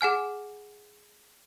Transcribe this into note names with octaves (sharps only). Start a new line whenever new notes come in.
G#4 F#5 G#5 F6